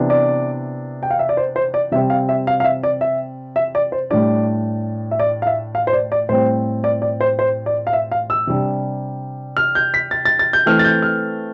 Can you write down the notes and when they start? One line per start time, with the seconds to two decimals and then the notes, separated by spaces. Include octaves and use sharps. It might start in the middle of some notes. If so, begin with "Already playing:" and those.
Already playing: C3 E3 B3 D4
0.10 D5
1.03 G5
1.11 F5
1.19 E5
1.29 D5
1.37 C5
1.56 C5
1.74 D5
1.92 C3 G3 C4 E5
2.10 F5
2.29 E5
2.47 F5
2.60 F5
2.64 E5
2.83 D5
3.01 E5
3.56 E5
3.75 D5
3.92 C5
4.10 A2 G3 D4 D5
5.11 E5
5.19 D5
5.42 F5
5.47 E5
5.75 F5
5.87 C5
5.93 D5
6.12 D5
6.29 A2 G3 C4 C5
6.84 D5
7.02 D5
7.21 C5
7.39 C5
7.66 D5
7.87 F5
7.93 E5
8.12 F5
8.30 E6
8.47 C3 G3 D4
9.57 F6
9.75 G6
9.94 B6
10.11 A6
10.25 A6
10.39 A6
10.53 G6
10.66 E3 A3 C4 F6
10.79 A6
10.85 G6
11.03 F6